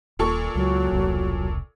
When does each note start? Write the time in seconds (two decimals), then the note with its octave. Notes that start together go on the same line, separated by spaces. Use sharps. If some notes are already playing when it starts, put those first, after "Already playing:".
0.19 D#1 A#2 A4 C#6
0.55 C#2 F#3
0.92 E1 C2